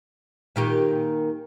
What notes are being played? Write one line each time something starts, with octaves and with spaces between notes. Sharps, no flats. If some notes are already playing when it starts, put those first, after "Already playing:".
A#2 D#3 G4